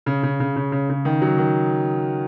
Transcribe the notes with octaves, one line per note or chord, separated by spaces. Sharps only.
C#3
C#3
C#3
C#3
C#3
C#3
D#3
F#3
D#3